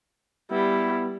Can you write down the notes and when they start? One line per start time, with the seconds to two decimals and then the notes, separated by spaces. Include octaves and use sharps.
0.51 G3 B3 E4